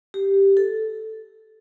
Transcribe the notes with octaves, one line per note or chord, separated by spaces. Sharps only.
G4
A4